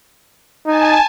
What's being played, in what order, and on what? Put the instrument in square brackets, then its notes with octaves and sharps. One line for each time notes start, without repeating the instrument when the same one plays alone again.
[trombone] D#4 [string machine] G#5 A5